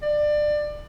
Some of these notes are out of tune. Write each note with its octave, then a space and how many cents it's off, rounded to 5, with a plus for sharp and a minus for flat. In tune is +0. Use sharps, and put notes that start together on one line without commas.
D5 +25